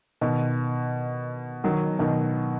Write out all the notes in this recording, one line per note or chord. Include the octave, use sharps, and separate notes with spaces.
B2 D#3
D#3 F#3
B2 D#3